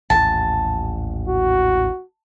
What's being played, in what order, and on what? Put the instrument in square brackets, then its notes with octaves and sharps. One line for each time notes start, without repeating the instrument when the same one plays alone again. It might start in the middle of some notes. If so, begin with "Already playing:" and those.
[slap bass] A1 D#2 G#2 [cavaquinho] A5
[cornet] F#4